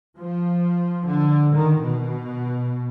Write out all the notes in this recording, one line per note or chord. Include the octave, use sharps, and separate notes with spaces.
F3
D3
D#3
B2